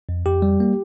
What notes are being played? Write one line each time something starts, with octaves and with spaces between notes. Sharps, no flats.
F2
F2 G4
G3
A#3